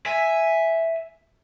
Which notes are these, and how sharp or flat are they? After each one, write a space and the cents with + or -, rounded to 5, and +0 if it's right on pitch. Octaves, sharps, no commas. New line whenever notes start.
E5 +0 G#5 +0